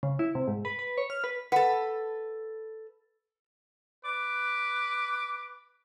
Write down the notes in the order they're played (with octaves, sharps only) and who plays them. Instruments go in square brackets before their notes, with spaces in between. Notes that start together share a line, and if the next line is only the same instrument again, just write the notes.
[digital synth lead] C#3
E4
C3
G#2
B4
B4
C#5
F6
B4
[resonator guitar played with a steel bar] A4 B4 [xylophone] F#5
[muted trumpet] B4 [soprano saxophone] D6